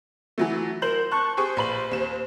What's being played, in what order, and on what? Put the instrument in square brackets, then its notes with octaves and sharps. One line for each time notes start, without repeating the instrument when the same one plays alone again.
[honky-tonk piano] E3 F#3 A3
[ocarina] A#4 [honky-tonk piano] C5 G6 F#7
[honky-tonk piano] A5 F#6 [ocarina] C#6
[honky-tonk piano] G4 G#4 C#6 [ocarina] C5
[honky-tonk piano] A#1 B4 F#7
D#2 E7